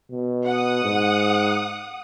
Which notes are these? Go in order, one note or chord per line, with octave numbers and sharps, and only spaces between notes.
B2
F#5 D#6
G#2